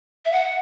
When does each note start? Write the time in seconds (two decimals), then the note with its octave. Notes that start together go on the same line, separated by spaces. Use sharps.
0.25 E5
0.32 F#5